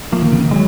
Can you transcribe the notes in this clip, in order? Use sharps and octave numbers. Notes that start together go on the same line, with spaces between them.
F3 A#3
D#3
C#3
D#3
F#3 G#3